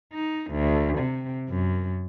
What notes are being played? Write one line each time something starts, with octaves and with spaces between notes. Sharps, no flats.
D#4
D2
C3
F#2